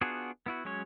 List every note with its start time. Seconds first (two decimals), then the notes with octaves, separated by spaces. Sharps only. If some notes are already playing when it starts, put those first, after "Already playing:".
0.01 B3 D4 F4 F#4 G#4
0.46 B3 E4 F#4
0.65 F#3 G#3 C#4 C#5